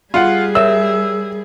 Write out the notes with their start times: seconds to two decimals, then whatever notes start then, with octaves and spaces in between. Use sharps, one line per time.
0.14 G3 F4 G#4 F#5
0.55 A#4 C#5 E5 E6